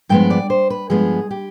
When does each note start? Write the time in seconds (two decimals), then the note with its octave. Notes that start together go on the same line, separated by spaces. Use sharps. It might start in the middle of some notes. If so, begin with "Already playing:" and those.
0.09 G2 F3 G#3 B3 G5
0.30 D5
0.50 C5
0.70 B4
0.90 G2 F3 G#3 B3 G#4
1.31 G4